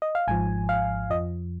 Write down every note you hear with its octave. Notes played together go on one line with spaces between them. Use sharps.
D#5
F5
G#1 G#2 F3 G#5
F5
F2 F3 D#5